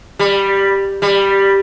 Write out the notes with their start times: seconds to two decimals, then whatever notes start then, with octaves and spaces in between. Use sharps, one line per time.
0.19 G3
1.02 G3